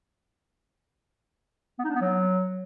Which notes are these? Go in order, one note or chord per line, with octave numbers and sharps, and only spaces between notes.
B3
D#4
D4
B3
F#3